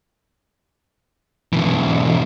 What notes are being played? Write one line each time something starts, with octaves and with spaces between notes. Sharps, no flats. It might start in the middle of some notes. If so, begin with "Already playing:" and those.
B1 E3